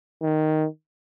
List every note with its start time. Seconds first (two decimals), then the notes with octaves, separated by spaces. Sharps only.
0.23 D#3